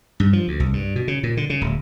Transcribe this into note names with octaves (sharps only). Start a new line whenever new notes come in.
G2
F3
D2
C2
G2
B2
C#3
A#2
D3
C#3
D1